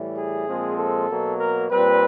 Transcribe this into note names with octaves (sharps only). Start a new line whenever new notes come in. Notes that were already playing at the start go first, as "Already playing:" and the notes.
Already playing: A2 E3 G3
G#4
A#2 F3 G#3 C4
A4
B2 F#3 A#3
A#4
A#2 G3 C4 B4